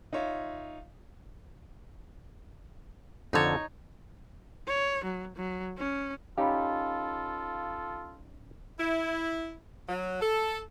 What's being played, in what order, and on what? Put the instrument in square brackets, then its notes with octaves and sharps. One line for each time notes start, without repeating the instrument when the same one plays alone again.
[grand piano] D#4 F4 C#5 E5
[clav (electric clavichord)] F2 D3 A5 [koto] D#4 C#5
[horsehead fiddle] C#5
F#3
F#3
C#4
[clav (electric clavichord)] C#4 D#4 G4 [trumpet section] F4 A4 [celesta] F5 B5
[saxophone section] E4
F#3
A4